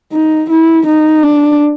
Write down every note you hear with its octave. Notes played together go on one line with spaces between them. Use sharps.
D#4
E4
D#4
D4